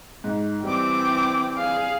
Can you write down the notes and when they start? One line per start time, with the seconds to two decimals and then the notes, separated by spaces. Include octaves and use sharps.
0.24 G#2
0.63 E3 G3 C4 G5 D6
1.58 G#4 F5